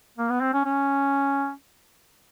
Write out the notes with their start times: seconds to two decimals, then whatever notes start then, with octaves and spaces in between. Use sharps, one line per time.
0.18 A#3
0.30 B3
0.41 C4
0.53 C#4
0.65 C#4